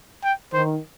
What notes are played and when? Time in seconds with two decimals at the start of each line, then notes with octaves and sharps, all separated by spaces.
0.24 G5
0.53 D#3 C5